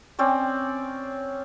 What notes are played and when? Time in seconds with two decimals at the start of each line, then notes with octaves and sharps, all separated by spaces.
0.19 C4 C#4 D5